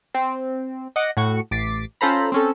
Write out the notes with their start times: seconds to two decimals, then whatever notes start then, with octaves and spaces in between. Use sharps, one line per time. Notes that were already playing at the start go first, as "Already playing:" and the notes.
0.14 C4
0.96 D#5 F#5 D6
1.17 A2 F#4 C#6 C#7
1.51 A1 D6 A6 B6 C7
2.01 C#4 F4 A4 C5 A#5 B5
2.32 C4 C#4 A4